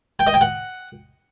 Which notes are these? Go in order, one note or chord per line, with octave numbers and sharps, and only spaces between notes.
G5
D#5
G5
F#5